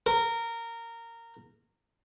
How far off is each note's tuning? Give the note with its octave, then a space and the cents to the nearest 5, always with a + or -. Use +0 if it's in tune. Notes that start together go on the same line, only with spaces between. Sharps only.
A#4 -15